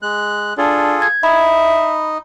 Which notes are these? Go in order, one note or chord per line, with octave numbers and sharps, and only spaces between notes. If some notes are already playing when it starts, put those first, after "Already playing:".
G#3 F#6
D4 F4 G#4 A4
G#6
D#4 E5 B5